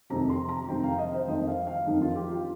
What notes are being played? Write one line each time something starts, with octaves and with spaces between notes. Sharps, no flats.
F2 C3 D#3 A#5
C6
A#5
F2 C3 D#3 G5
F5
D#5
C5
F2 D#3 D#5
F5
F5
F2 D#3 D#4
F4
G4
F4